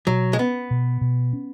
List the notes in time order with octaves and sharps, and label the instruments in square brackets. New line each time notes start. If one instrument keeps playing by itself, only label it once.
[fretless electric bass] B2 [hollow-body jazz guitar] F#3
[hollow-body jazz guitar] G#3
[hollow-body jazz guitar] B3 [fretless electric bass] C#4
[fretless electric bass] B2
B2
C#4